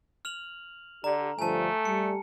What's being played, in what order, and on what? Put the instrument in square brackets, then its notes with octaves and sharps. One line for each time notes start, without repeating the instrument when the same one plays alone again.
[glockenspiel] F6 F7 F#7
[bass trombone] D3 [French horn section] G4 D5 [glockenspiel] A#5
[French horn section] G2 D3 F3 [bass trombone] A3 [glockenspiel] G#5 A5
[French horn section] G3 [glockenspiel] C#7